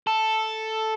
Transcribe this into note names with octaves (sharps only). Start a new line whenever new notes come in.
A4